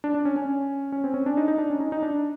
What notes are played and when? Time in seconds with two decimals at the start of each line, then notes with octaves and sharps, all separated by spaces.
0.04 D4
0.15 D4
0.25 C#4
0.36 C#4
0.92 C#4
1.04 C4
1.14 C#4
1.26 D4
1.37 D#4
1.48 D#4
1.58 D4
1.70 C#4
1.80 D#4
1.92 D#4
2.03 D4